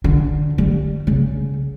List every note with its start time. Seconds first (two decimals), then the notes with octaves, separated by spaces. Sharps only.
0.04 D3
0.58 G3
1.07 C#3